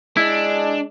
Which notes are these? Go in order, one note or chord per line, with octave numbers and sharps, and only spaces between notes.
G#3 D4 E4